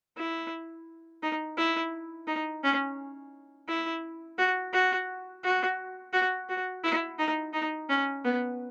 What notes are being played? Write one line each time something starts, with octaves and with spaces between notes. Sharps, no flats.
E4
D#4
E4
D#4
C#4
E4
F#4
F#4
F#4
F#4
F#4
E4
D#4
D#4
C#4
B3